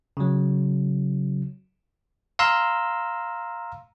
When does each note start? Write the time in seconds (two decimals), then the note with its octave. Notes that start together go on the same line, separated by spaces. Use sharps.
0.17 C#3 F#3
2.39 F5 A#5 C6 E6